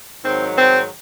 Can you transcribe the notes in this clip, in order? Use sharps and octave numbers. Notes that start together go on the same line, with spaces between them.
G#2 D#3 F#3 C4
C4